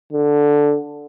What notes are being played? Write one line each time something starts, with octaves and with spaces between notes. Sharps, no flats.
D3